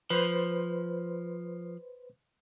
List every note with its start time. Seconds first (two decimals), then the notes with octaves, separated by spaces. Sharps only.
0.10 F3 B4 C5 C6